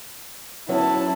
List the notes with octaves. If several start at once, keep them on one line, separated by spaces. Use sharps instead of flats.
F#3 B3 C#4 E4 A5